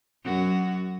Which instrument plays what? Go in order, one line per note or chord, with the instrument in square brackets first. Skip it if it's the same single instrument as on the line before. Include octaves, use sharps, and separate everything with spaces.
[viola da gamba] F#2 F#4